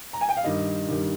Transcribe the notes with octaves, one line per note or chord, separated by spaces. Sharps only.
A#5
G#5
G5
F5
G2 D#3 G3 D#5
G2 D#3 G3